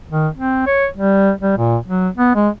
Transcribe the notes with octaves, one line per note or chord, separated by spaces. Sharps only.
D#3
C4
C#5
G3
G3
A#2
F#3
B3
G#3